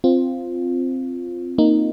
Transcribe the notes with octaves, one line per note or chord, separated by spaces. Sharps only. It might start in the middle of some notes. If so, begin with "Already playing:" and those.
C4 F4
A#3 D#4